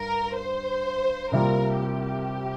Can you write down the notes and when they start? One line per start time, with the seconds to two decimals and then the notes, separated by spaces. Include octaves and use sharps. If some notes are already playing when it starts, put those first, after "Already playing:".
Already playing: G2 G3 A#4
0.37 C5
1.32 C2 C3 G3 A#3 F4 A#4
1.79 G4